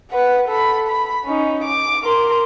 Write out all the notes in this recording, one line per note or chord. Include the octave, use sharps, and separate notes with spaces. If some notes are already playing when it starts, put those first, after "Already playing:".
B4 F#5
A4 B5
B5
C#4 D#4
D6
A#4 C6